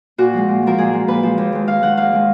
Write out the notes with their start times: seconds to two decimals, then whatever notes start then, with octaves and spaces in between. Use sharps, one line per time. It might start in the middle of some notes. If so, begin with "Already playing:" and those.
0.18 A#2 F#4
0.33 F3 G#3
0.48 A#2
0.63 F3 G#3 A#4
0.78 A#2 G#4
0.93 F3 G#3
1.08 A#2 B4
1.23 F3 G#3
1.38 D#2
1.52 D#3 G#3
1.67 D#2 F5
1.82 D#3 G#3 F#5
1.97 D#2 F5
2.12 D#3 G#3